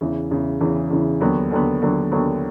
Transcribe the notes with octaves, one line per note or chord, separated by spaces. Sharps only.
E2 C#3 E3
E2 C#3 E3
E2 C#3 E3
E2 C#3 E3
D#2 D3 F#3 B3
D#2 D3 F#3 B3
D#2 D3 F#3 B3
D#2 D3 F#3 B3